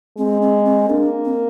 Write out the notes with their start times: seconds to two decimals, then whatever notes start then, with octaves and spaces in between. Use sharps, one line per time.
0.17 G#3 C4
0.42 C4
0.65 C4
0.89 A#3 D4
1.25 C4